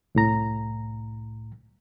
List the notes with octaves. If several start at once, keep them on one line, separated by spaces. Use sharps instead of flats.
C2 A2 A#5